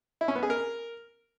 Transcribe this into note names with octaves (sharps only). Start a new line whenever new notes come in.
E4
C#4
B3
G#4
A#4